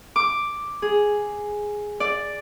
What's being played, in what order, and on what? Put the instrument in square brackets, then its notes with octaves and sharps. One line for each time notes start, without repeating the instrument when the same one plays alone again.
[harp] D6
G#4
D5